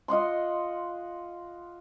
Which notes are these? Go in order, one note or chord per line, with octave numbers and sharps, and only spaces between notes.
F4 D#5 F#5 C6